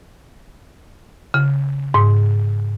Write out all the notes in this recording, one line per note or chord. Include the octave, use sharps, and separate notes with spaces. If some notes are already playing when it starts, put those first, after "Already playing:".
C#3
G#2